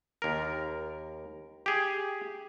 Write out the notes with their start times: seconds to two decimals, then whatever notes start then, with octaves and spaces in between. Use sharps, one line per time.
0.22 D#2 A#4
1.66 G4 G#4